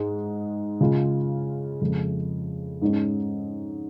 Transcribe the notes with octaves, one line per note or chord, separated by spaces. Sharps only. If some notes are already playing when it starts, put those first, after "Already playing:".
Already playing: G#2 G#3 D#4
C#3 G#3 F4
F2 C#3 G#3
G#2 G#3 C#4